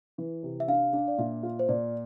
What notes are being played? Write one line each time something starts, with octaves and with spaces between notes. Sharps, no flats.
E3
C3
E5
D4 F5
D4
D5
A#2 E5
F4
C5
A#2 D5